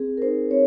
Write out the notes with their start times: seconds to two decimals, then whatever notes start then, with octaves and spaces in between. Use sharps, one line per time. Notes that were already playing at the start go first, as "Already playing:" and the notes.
Already playing: C4 G#4
0.17 A#4
0.22 D#4 C5
0.51 C4 C#5